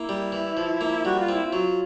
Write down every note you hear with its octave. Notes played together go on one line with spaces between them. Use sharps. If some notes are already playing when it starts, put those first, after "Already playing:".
Already playing: A#3 E4
G3
E3
F3
A#3
G3 F#4
F4
C4 E4
F4
F#3